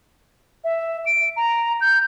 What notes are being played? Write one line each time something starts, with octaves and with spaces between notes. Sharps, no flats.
E5
D7
A#5
G6